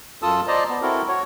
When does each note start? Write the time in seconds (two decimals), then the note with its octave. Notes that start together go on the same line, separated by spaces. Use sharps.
0.22 F#2 F4 A4 A5 D#6 E6
0.48 C5 D5 D#5 A5 A#5
0.69 B3
0.82 C4 E4 F#4 A4 A#4
1.08 F#4 C#5